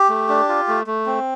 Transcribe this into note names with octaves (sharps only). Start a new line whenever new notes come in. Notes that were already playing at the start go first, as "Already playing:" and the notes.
Already playing: G4
A3
D4
F4
A3
A3
C4